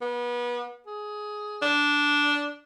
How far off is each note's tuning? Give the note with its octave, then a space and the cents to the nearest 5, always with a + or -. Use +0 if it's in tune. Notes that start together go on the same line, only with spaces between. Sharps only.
B3 -30
G#4 +10
D4 -10